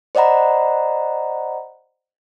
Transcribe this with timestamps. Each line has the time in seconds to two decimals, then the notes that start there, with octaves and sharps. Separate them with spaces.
0.15 C5 D5 D#5 F#5 A#5 B5